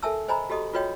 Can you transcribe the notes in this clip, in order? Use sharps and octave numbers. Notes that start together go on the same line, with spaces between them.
A4 A#4 E5 G#5 A5 E6
C5 D#5 G#5 A#5 B5
F#4 G4 A4 D#5 D#6
F4 F#4 B4 C#5 D#5 G5